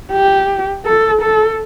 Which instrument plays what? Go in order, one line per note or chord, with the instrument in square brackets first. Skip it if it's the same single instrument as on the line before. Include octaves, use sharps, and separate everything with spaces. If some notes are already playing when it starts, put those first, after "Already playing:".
[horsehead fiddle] G4
A4
A4